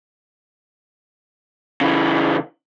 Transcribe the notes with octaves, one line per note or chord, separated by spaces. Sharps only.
C#3 E3